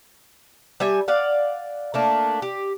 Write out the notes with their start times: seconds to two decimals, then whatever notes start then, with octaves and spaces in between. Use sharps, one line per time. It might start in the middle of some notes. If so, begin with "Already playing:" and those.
0.80 G3 E5 G#5
1.08 D5 F5 F#5
1.94 A3 A#3 D4
2.42 G4